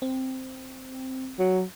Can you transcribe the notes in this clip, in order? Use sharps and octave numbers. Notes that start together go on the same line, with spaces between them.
C4
F#3